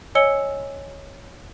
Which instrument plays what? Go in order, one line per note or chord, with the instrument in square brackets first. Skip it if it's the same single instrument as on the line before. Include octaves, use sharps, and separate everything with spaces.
[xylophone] C#5 D#5 G#5 E6 C#7 G7